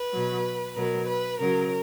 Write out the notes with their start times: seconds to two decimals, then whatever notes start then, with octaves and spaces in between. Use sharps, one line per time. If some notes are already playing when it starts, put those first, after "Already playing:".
Already playing: B4
0.13 B2 F#3
0.75 B2 F#3 A#4
1.07 B4
1.38 C#3 F#3 A#4